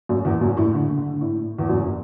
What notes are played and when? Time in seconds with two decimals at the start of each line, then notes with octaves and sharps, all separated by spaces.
0.09 F#2
0.25 E2
0.41 F#2
0.57 A2
0.73 D3
0.97 D3
1.21 A2
1.59 E2
1.69 F#2